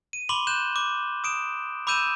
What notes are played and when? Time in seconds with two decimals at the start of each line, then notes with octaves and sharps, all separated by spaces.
0.13 D#7
0.29 B5 C6 D6 F#7 G7
0.47 F#6 G6 E7
0.76 D6
1.24 D#6 D7 E7
1.87 B5 D6 E6 G6 D#7 E7